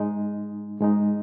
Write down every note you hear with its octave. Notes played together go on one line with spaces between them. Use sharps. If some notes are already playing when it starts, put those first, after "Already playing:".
Already playing: G#2 G#3 D#4
G#2 G#3 D#4